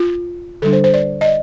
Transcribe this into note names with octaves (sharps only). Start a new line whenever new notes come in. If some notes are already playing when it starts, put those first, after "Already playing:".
Already playing: F4
D3 G3 D4 A4
C5
C5
D5
D#5
D5